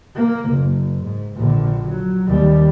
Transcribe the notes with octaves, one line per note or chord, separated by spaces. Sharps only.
A#3
F#1
G#2
A#1 D3
F#3
D#2 G3